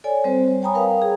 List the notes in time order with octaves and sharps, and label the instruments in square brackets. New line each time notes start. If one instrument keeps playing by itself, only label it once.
[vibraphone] A4 C#5 D5 G#5
G3 C4 C5
G3
C#5 G5 G#5 A#5 B5 D#6
A#4 B4 F5 G5
G#4